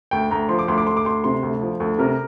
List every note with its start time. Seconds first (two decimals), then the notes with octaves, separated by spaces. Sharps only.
0.11 D2 G5
0.31 D2 A#5
0.49 F3 C6
0.59 D6
0.68 D2 C6
0.78 D6
0.87 D2 C6
0.97 D6
1.05 D2 C6
1.24 C3 C6
1.43 D2
1.61 F3
1.80 D2
1.99 C3 A#4